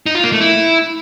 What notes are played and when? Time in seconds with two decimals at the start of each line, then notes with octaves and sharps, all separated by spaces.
0.06 D#4
0.15 F4
0.24 A#3
0.32 A3
0.41 E4